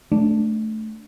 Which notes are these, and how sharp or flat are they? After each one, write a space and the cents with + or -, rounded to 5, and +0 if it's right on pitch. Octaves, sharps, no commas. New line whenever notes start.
A3 -10 D4 +0